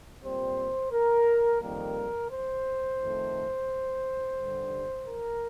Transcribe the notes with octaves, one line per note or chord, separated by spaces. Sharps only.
A#2 G3 C4 C5
A#4
F2 D#3 G3 A#3 A#4
C5
F2 D#3 A3
G2 D3 G3
A#4